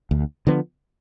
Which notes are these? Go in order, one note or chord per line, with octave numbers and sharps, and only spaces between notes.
D2
D3 F3 B3